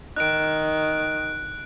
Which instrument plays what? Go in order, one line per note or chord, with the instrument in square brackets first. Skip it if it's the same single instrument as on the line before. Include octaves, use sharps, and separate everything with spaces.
[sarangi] D#3 [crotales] F#6 D7